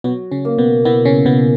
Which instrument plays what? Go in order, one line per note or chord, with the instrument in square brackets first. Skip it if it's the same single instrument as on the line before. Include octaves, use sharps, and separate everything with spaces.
[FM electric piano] B2 B3 [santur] F#3
[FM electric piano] C#3 C#4
[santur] A#3
[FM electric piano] B2 B3
[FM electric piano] B2 B3 [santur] E4
[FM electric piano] C#3 C#4
[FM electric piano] B2 B3 [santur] A#4